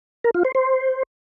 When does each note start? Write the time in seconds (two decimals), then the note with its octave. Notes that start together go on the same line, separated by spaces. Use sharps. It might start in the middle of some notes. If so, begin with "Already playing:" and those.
0.24 A#4
0.34 F4
0.45 C5
0.55 C5